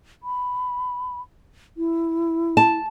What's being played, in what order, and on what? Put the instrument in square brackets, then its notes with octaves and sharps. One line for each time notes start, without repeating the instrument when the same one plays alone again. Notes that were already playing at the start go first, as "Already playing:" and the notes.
[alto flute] B5
E4
[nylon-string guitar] A5